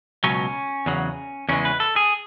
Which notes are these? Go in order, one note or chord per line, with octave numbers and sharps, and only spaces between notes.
C#2 B2 F#3 C#4
E2 C#3 F#3
E2 C#3 E3 G#3 C#4
B4
A4
G#4